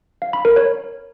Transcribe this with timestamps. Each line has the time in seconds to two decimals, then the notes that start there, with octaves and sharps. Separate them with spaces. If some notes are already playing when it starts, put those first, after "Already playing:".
0.22 F5
0.33 B5
0.45 A#4
0.56 C#5